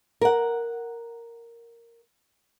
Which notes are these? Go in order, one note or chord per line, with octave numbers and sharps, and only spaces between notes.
A#4 F#5